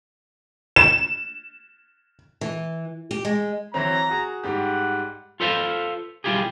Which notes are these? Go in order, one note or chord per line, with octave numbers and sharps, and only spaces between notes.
E7
E3
G4
G#3
E3 F#3 C4 A#5
F#4 G#4
G#2 G3 G4 F#5
F4 A4 B4 C5 F5
B1 G3 E4 F4 G4 G#4